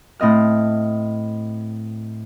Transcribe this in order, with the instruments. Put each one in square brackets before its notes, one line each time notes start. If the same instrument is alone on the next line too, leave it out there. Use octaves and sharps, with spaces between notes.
[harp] A2 C4 D#5 F6